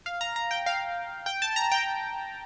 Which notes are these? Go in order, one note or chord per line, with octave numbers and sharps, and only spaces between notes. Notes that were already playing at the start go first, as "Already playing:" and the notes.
F5
A#5
A#5
G5
F5
G5
A5
A#5
G5